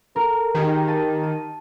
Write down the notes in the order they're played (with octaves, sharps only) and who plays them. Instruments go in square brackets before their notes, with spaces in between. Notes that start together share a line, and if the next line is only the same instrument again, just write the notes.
[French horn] A4 [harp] A#4
[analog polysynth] D#3 [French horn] G4 [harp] G#4
[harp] A5 D#7
D#7